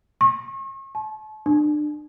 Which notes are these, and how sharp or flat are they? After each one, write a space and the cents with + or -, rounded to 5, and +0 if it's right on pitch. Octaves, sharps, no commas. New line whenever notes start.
C#6 -40
A5 -35
D4 +30